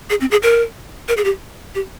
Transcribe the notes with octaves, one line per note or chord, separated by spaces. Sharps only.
G#4
C4
G#4
A#4
A#4
G#4
G4
G4